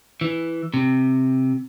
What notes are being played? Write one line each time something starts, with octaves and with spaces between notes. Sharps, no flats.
E3
C3